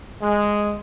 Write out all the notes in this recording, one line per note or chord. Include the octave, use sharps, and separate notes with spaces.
G#3